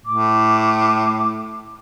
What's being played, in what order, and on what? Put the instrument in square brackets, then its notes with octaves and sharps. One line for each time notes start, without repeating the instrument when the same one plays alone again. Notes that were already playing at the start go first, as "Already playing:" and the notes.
[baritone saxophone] A2 [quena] D6